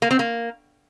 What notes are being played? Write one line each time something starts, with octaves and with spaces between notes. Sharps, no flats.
A#3
C4
A#3